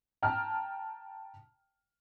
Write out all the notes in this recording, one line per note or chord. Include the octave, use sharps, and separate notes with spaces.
G5 A5 A#5 F6